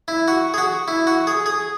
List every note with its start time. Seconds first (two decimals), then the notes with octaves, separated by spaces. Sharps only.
0.08 E4
0.28 F#4
0.54 G#4
0.58 F#4
0.88 E4
1.07 F#4
1.27 G#4
1.46 G#4